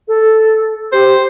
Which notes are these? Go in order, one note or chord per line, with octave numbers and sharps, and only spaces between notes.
A4
G4 C5